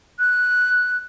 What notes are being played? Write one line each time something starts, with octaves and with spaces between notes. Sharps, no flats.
F#6